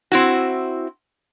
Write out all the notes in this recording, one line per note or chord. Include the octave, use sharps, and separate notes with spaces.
C4 E4 F#4